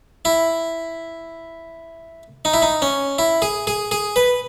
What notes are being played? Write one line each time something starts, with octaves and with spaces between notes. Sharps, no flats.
E4
D#4
E4
D#4
C#4
E4
G#4
G#4
G#4
B4